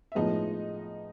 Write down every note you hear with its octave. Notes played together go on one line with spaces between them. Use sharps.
E5
A2 F3 G#3 B3 D#4 D#5